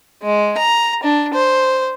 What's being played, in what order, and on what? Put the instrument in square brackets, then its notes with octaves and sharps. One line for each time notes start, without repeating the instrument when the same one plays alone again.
[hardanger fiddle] G#3
A#5
D4
C5